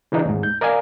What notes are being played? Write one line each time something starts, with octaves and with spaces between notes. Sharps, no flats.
C#3 E3 D4 D#4
D#2 G#2
G6
A#4 D5 D#5 F5 G#5 A#5